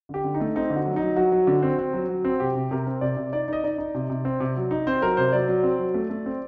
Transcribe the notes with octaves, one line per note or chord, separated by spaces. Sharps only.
D3 G4
D3
D#4
A3
C4 D#4
D3
F#4
F#3
D#4
F#3
F#3 F#4
F#3
D3
C4
C4
F#3
F#3
C4
C3 G4
C3
C3 A#4
C4
C3 D5
C3
D#4 D5
D#4 D#5
D#4 D5
D#4
C3
C3
C4
C3
F#3
D#4
C4 C5
F#3 A#4
C3 C5
F#3 D5
F#3
C4
F#3
A3
A3
C4